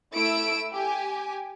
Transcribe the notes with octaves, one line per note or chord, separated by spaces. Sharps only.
A3 E4 E6 D7
G4 G#5